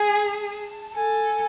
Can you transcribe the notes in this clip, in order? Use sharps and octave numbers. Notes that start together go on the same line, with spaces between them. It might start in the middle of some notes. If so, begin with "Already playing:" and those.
Already playing: G#4 G#5
A5
A4 G#5